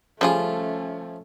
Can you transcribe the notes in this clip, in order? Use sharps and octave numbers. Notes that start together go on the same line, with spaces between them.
C#3 F3 G3 A3 C#4 F4 G#4